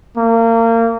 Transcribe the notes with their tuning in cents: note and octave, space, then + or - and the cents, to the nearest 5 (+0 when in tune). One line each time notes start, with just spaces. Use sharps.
A#3 -30